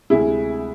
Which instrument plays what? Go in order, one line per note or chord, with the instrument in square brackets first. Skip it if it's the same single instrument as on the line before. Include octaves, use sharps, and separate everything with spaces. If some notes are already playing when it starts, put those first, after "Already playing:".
[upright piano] D2 C3 G#3 E4 G#4